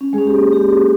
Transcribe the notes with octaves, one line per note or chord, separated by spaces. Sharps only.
C#4
G#3 C#4 G#4
G4
A#3
C#4 G4
F#4